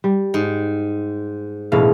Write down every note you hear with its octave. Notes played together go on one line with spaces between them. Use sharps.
G3
G#2
E1 A2 E4 F5